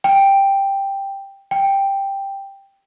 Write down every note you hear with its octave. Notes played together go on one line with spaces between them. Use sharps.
G5
G5